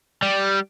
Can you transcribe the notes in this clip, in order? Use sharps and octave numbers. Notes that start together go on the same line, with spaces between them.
G3